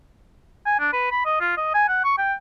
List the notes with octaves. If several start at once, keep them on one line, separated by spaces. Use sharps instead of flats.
G#5
D4
B4
B5
D#5
F4
D#5
G#5
F#5
C#6
G5